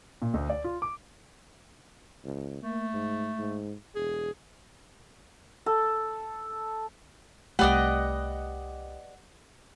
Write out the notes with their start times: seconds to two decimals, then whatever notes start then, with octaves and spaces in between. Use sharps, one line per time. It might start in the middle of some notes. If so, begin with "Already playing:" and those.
0.22 A#2
0.34 D2
0.50 D5
0.64 F4
0.82 D6
2.24 C#2
2.63 A3 A#3
2.94 G#2
3.38 G#2
3.95 E1 G#4
5.66 A4
7.59 C2 A3 G4 B4 D5 D#5 F#5